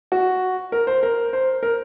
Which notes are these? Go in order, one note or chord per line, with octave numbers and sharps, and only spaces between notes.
F#4
A#4
C5
A#4
C5
A#4